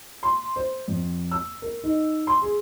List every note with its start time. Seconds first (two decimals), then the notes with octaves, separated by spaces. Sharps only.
0.23 C6
0.56 C5
0.88 F2
1.31 E6
1.62 A#4
1.84 D#4
2.27 C6
2.42 G#4